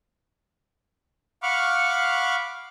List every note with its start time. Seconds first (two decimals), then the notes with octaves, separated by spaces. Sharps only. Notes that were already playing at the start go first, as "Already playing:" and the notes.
1.43 F5 F#5 B5 C#6 D6 F6